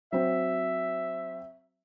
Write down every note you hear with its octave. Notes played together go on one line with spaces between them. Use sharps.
F#3 C4 E5